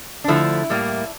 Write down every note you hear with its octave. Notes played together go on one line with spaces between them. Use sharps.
D4
D3 F3 A3 E4
A2 G3 A#3